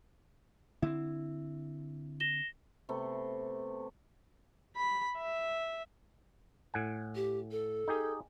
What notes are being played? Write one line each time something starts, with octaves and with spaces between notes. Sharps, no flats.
D3 C4 E4
A#6 E7 G7
C3 A3 B3
B5
E5
A2 F#5 G#5
G4
A4
D#4 G4 G#4